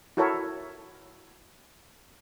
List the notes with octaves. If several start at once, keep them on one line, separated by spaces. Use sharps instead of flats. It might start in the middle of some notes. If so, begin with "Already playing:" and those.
E4 F#4 A4 A#4 C#5 E5